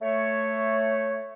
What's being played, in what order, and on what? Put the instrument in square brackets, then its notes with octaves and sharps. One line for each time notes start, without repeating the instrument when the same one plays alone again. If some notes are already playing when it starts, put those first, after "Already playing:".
[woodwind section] A3 C#5